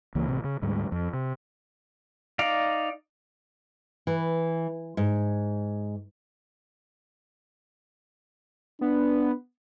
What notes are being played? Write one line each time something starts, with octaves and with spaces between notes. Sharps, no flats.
C#2 E3 A#3
A1 C3
C#3
D2 G#2 G3
F2
C3
D#4 D5 F5
E3
G#2
B3 D4